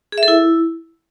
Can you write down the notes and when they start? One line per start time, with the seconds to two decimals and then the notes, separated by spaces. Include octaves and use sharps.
0.12 G#4
0.18 E5
0.23 A4
0.28 E4